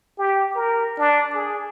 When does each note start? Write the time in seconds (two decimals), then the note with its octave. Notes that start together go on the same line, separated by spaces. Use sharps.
0.18 G4
0.55 A#4
0.99 D4
1.34 G#4